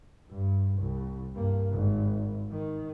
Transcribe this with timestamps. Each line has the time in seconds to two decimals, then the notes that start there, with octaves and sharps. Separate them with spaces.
0.29 G2
0.79 C2
1.34 G2 A#3
1.72 G#1
2.51 D#3